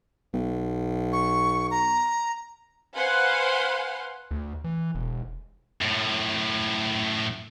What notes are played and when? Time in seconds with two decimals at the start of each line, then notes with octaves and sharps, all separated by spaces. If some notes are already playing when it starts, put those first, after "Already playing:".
0.34 B1
1.13 C#6
1.71 A#5
2.95 B4 C5 F5 F#5 G#5 C6
4.31 D2
4.64 E3
4.95 E1
5.81 F#2 A2